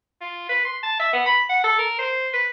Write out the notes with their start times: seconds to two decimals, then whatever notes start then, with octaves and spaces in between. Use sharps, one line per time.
0.21 F4
0.49 B4
0.65 C6
0.83 A5
0.99 E5
1.13 B3
1.26 B5
1.49 F#5
1.64 A4
1.79 A#4
1.98 C5
2.33 B4